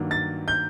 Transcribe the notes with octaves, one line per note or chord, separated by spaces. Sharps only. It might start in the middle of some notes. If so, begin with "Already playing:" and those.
Already playing: G2 D#3 F#3 A#3
A6
G6